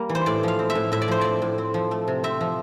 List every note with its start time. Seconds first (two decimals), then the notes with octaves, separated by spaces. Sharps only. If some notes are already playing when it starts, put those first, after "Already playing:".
Already playing: G3 A#3
0.09 E3
0.15 C5
0.26 A2 D5
0.43 F3 F5
0.59 C4
0.70 E5
0.75 A2
0.92 A2 E5
1.02 D5
1.08 F3 C5
1.21 C4 D5
1.42 A2
1.58 C4
1.74 F3
1.91 A3
2.08 C3
2.24 C4 E5
2.41 F3